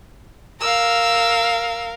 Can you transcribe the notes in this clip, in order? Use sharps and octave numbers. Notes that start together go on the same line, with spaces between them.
A#4 F5 E6